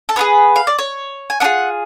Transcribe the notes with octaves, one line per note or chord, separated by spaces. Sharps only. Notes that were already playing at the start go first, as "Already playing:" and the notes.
A4
B3 F4 G#4 B4
F5
D5
C#5
G#5
B3 D4 F4 G#4 F#5